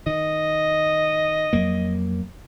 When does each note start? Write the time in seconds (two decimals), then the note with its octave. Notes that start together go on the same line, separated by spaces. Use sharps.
0.06 D#3 D#5
1.53 F2 F#3 A#3